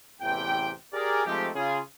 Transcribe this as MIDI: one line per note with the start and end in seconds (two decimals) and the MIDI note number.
0.22 0.72 33
0.22 0.72 40
0.22 0.72 48
0.22 0.72 52
0.22 0.72 79
0.93 1.24 67
0.93 1.24 68
0.93 1.24 70
0.93 1.24 74
1.26 1.48 53
1.26 1.48 56
1.26 1.48 57
1.26 1.48 60
1.26 1.48 63
1.26 1.48 67
1.54 1.79 49
1.54 1.79 65
1.54 1.79 68